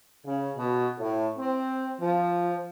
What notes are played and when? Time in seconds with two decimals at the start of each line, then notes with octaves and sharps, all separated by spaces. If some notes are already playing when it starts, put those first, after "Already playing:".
0.25 C#3
0.56 B2
0.99 A2
1.37 C4
2.00 F3